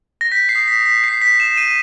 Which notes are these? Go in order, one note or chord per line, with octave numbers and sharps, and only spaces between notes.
A#6
G6 B6
C7
D#6
B6
D#6
B6
G6 C7
B6
G6
E7
G6
D#7